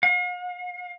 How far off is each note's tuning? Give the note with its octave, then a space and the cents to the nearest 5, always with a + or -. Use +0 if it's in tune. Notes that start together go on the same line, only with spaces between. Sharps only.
F5 +45